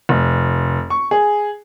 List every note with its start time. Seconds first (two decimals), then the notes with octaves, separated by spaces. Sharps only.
0.09 F1
0.90 C#6
1.11 G#4